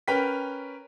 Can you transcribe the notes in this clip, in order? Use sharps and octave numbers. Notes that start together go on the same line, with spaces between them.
C#4 A#4 B4 G5 B6